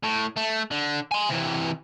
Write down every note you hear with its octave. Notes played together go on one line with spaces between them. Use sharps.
A2
A3
D3
G#5 C6
C3 E3